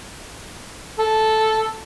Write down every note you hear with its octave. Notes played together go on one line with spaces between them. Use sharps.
A4